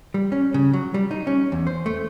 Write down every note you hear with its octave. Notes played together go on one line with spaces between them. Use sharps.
G3
C#4
C#3
F#3
G3
D#4
C#4
E2
C5
A3